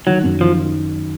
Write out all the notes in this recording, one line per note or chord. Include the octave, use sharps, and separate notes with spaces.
D#3 F#3
F#2
D#3 F3
D#4